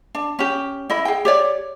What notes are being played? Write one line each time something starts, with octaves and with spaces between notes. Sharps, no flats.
D4
C#4 G4
E4 D#5 B5
G#4 G5
G4 C#5 D5